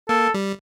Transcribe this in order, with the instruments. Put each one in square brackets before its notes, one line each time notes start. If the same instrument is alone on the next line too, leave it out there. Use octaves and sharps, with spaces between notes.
[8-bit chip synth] A#3 [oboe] A4
[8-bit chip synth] G3